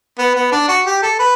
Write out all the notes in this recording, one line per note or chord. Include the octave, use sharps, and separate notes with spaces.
B3
B3
D4
F#4
G4
A4
B4